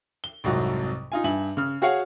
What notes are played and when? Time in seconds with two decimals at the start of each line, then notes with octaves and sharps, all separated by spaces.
0.24 G7
0.44 C2 F2 G#2 F#3
1.12 D#4 F4 G#5
1.24 G2 E5 G#5 F#7
1.57 C#3 F6
1.82 F#4 G#4 C#5 F5 F#5 G#5